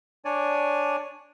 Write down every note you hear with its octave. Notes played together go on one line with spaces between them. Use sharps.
D4 C#5 D5 G#5